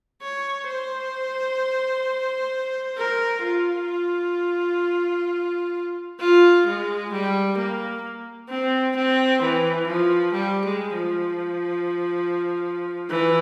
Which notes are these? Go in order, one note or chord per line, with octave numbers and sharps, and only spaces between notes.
C#5
C5
A#4
F4
F4
G#3
G3
A#3
C4
C4
E3
F3
G3
G#3
F3
E3